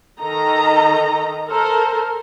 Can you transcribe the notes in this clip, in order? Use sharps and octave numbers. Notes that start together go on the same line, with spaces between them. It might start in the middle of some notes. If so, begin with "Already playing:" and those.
D#3 A4 D#5 A#5
A4 A#4 C5